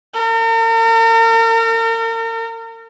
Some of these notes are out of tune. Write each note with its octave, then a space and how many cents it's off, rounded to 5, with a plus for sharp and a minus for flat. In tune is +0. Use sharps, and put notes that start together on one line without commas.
A#4 -40